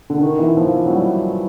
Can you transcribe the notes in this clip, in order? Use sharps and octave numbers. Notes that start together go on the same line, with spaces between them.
D3
D#3
E3
F3
F#3
G3